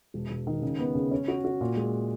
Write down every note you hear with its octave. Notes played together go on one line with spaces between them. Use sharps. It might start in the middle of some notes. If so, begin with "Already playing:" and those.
E1
E1
D#3
C#3
B3
C#3
C#4
F#4
F#4
A#2
G#3